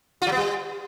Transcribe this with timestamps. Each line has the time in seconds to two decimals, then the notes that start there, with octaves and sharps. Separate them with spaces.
0.22 F4
0.27 F#3
0.32 B3
0.37 G3